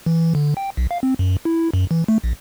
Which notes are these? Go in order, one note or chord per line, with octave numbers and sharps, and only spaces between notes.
E3
D3
G5
B1
F5
C4
F#2
E4
F#2
E3
A3
A#1